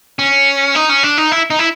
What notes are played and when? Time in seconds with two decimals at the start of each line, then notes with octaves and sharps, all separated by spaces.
0.19 C#4
0.75 D#4
0.89 C#4
1.03 D4
1.18 D#4
1.32 E4
1.50 D#4
1.59 E4